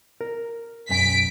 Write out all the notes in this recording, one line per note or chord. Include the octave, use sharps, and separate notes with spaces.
A#4
B1 F#2 G#5 B6 D7